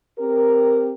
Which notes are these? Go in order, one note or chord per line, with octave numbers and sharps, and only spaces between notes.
C4 G4 A#4